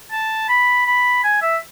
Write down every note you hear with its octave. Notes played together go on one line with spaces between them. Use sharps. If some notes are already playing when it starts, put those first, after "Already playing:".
A5
B5
B5
G#5
E5